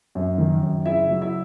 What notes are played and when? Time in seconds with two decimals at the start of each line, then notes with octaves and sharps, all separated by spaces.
0.15 F#2
0.38 D#3
0.63 F#2
0.86 C#3 E4 E5
1.10 F#3
1.21 E4 E5